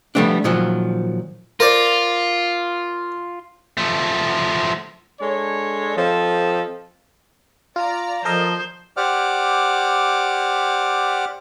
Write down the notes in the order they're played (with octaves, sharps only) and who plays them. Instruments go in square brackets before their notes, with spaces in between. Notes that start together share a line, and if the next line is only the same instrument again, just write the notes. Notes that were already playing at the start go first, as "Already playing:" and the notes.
[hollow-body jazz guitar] F3 G3 A3 B3 D4
A#2 D#3 F3 F#3
[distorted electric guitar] F4 [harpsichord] A#4 C5 D5
[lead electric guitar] F3 A3
[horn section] G#3 D4 A4 C#5
F3 C4 A4 C5 D#5
[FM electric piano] F4 [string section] D5 A#5
[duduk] F3 [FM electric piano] A4 A#4 D#5 [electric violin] C5
[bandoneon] G4 C5 D5 F#5 D6 F6